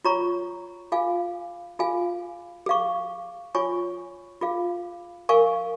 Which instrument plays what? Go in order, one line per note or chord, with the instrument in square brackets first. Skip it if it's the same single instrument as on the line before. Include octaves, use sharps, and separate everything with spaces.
[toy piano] F4 C#5 A#5 C#6
F4 G#4 F5 G#5
F4 G#4 F5 G#5
G#4 F5 C#6
F4 C#5 G#5 C#6
F4 G#4 F5
A#4 F5 G#5 C#6